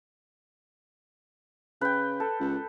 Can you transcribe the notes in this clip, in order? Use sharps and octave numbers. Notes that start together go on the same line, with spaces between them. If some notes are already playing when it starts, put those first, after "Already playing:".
C#3 B4 G5
A4
C#2